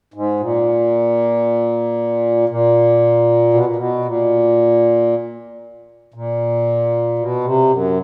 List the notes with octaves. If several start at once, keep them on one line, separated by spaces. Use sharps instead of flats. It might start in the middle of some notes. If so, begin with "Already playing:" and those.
G#2
A#2
A#2
B2
A#2
B2
A#2
A#2
B2
C3
F#2